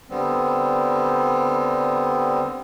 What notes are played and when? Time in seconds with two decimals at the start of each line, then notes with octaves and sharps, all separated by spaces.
0.10 D3 G3 B3 C4